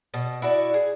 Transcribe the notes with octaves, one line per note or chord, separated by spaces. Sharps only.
B2
E4 F#4 D5
G#4